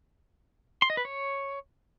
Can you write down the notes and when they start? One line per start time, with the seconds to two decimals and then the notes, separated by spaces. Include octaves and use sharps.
0.82 C6
0.90 D#5
0.97 B4
1.05 C#5